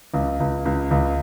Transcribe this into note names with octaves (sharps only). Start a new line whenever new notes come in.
C#2
C#2
C#2
C#2